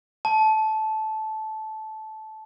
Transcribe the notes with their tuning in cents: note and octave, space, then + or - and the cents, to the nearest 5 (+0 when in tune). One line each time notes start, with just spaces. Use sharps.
A5 -15